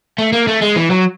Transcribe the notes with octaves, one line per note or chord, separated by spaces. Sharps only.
A3
A#3
A3
G#3
E3
F#3